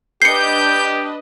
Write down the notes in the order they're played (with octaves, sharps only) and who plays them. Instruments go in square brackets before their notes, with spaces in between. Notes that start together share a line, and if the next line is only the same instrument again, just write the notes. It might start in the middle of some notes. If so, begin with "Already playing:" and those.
[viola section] D4 B4 D#5 [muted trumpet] G4 [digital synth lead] G6 [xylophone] C7 C#7